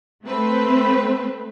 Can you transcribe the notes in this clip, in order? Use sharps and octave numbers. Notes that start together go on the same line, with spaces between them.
A3 C4 B4 C5